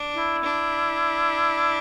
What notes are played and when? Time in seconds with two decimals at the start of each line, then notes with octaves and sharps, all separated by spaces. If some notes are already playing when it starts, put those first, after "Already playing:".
Already playing: D4
0.16 E4
0.44 D4